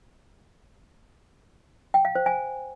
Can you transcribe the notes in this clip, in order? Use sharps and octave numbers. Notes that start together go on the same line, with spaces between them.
G5
F5
C5
G#5